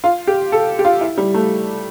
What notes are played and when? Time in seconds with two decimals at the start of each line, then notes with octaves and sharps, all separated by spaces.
0.04 F4
0.27 G4
0.52 A4
0.79 G4
0.85 F4
1.01 E4
1.18 G3
1.34 A3